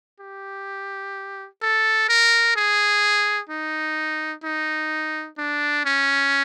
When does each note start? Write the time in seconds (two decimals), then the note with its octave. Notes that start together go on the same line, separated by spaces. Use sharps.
0.20 G4
1.62 A4
2.09 A#4
2.56 G#4
3.49 D#4
4.44 D#4
5.38 D4
5.85 C#4